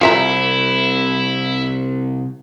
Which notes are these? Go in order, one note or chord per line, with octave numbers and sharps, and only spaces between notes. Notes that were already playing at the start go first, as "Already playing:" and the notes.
C2 F#2 E4 F4 E5 A#5